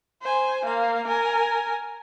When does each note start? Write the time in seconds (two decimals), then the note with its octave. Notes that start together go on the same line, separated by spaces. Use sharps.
0.22 C5 G#5
0.65 A#3 F5
1.07 A#4 G#5